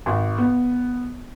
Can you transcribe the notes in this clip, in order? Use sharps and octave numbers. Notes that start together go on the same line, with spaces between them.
G#1
B3